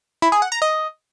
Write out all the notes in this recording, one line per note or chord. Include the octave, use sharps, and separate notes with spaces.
E4
G#4
F#5
A#5
D#5